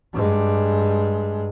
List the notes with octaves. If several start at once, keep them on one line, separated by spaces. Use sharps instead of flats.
G2 G#3